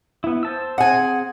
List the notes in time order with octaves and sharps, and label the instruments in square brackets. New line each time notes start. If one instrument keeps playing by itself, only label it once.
[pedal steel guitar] B3 E4
C5 A5 E6
[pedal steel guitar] C4 G#4 [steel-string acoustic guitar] F#5 G#5